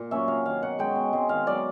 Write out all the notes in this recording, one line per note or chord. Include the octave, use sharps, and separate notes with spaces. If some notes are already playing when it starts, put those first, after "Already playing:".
Already playing: A#2
F#3 A#3 C#4 E5
C3 F5
D#3 F#3 F5
B2 F#5
G#3 C#4 G5
B2
G#3 C4
D#3 F5
F#3 B3 D5